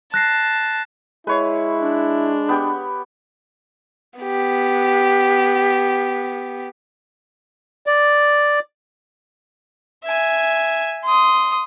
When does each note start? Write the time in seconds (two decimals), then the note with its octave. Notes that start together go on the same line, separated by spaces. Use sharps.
0.14 A5 F#6 A#6 C7
1.27 G#3 E4 B4 C#5 F5
1.80 D4
2.49 B3 G4
4.20 B3 G4
7.87 D5
10.05 E5 G#5
11.05 C6 D#6